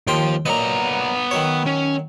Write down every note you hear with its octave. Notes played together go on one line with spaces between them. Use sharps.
D#2 F3 G5 C6
A#2 F#3 B3 D#5 A#5
D#3 F#3 C#5
C#4